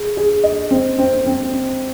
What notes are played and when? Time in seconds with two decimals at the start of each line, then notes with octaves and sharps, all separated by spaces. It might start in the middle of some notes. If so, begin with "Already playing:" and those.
Already playing: G#4
0.17 G#4
0.43 D#5
0.71 C4
0.98 C4
1.26 C4